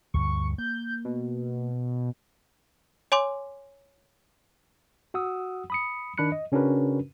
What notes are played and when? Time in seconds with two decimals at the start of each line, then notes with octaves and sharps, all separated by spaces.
0.14 D2 G2 D3 C#6
0.58 A#3 G6
1.05 B2
3.12 C#5 G#5 C6 D6
5.14 F#4 F#5 D#6 E6
5.70 B5 D#6 C#7
6.17 D#3 D4 B5 F#6 C#7
6.32 D#5
6.52 C#3 C#4 D4 F#4 A#4 B4